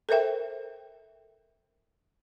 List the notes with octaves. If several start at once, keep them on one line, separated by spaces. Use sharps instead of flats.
A4 A#4 C5 E5 G5